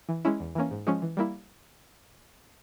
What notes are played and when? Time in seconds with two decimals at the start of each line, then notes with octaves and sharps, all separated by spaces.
0.09 E3
0.25 G#3 C#4 E4
0.40 E2
0.55 E3 A#3 C#4
0.71 G#2
0.87 F3 G#3 C#4
1.02 E3
1.17 G3 A#3 E4